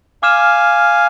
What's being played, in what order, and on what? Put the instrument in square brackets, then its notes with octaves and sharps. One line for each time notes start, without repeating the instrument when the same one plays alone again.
[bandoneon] F5 G#5 [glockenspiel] D6 F6 E7